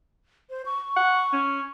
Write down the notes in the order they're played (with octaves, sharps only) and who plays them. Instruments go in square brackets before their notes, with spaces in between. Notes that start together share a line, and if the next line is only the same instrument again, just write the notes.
[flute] C5
C#6
[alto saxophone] F#5
C#4